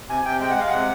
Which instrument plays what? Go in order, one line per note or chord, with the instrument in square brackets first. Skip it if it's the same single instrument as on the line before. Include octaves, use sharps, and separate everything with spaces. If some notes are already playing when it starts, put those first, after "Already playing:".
[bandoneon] C3 G#5
C3 G5
G#3 G5
F#5
G#3 F5
C3 F#5